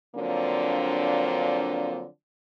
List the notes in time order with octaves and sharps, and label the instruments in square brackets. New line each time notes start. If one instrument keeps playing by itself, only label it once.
[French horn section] D3 F3 F#3 A#3 C4 D4